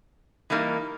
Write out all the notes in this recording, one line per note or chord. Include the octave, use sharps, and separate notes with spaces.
E3 G3 A#3 D#4